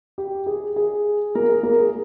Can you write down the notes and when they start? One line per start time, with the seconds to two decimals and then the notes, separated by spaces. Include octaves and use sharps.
0.18 G4
0.46 G#4
0.76 G#4
1.35 A#3 A#4
1.49 G#4
1.63 A#3 A#4
1.78 G#4